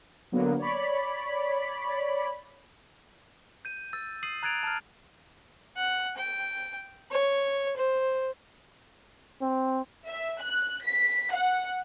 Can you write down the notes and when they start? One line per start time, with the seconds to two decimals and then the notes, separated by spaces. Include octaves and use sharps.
0.32 D3 F#3 A#3 B3
0.59 C#5 D5 B5
3.65 G6 D#7
3.93 E6 A6
4.23 D#6 C7 D#7 F#7
4.43 A#5 F#6 G#6 A6 D7 F7
4.63 A5 F6
5.77 F#5
6.17 G5
7.11 C#5
7.77 C5
9.41 C4
10.08 E5
10.42 F#6
10.84 B6
11.33 F#5